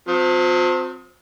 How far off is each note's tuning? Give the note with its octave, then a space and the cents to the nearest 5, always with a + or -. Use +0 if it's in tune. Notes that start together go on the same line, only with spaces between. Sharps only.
F3 +45 C4 -20